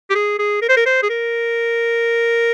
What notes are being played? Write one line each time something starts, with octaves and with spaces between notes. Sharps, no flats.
G4
G#4
G#4
A#4
C5
A#4
C5
G#4
A#4